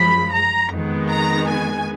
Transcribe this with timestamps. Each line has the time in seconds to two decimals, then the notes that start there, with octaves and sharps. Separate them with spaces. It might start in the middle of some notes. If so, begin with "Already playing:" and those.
Already playing: F#2 F3 G#3 B5
0.32 A#5
0.70 F2 D#3 G#3 B3
1.09 A#5
1.48 G#5